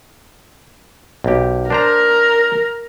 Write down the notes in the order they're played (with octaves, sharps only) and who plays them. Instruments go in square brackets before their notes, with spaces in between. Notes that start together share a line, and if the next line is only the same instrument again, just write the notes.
[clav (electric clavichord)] B1 G4
[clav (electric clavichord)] D4 C5 A#5 [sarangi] A#4